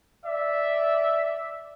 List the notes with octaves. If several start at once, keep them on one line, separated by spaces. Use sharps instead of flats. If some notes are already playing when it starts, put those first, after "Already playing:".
D5 E5